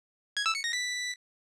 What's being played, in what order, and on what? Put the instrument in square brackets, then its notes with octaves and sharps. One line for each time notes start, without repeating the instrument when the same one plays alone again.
[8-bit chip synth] G#6
E6
C#7
A#6
B6